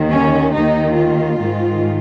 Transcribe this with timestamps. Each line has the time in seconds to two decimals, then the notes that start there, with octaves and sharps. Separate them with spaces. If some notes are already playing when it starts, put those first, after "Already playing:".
Already playing: D#2 D#3
0.11 C#4
0.54 D#2 D#3 D#4
0.96 F4
1.39 G#2 D#3